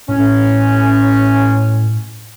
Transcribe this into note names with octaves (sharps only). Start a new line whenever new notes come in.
A2 C#4